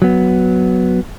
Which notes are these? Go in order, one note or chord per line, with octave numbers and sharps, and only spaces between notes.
F#3 B3